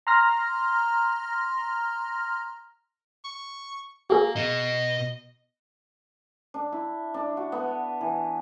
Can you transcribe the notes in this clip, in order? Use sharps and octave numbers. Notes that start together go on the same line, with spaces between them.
A#5 C6 F6 A#6
C#6
A#3 F#4 G#4
B2 D#5
D4
E4
D4
F#4
B3
E3